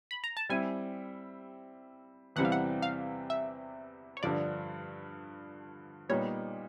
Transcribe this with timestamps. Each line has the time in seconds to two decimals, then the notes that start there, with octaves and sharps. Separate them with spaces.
0.11 B5
0.24 A#5
0.37 A5
0.49 G3 C4 E4 G#5
2.36 E2 C3 E3 G3 C4 F#5
2.45 F5
2.52 F#5
2.82 F5
3.30 E5
4.17 C#5
4.23 G2 D3 F3 D5
6.09 A#2 G3 B3 D#4 C#5